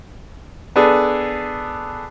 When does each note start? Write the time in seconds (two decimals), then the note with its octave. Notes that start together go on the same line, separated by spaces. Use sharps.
0.76 B3 D4 G#4 A4